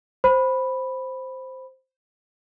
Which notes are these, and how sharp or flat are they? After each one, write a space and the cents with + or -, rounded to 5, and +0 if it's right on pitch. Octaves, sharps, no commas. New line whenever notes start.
C5 +0 B5 +0